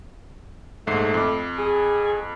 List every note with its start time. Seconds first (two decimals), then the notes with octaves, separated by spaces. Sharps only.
0.87 A#1 G#2 A3 C7
1.14 F2 D6
1.58 G#4